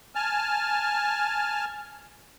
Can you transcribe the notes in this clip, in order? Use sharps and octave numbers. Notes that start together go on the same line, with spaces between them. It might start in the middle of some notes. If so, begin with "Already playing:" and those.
G#5 A5 F6